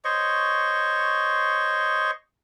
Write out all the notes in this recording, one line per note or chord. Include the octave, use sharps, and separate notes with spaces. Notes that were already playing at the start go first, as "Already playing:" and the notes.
C5 C#5 D#5 C#6